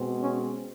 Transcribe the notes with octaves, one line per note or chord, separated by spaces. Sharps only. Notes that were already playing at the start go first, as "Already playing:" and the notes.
Already playing: B2 G#3 C4
C#4